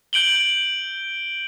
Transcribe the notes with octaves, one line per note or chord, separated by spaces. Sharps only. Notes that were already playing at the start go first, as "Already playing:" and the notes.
G6 D7 F#7 G7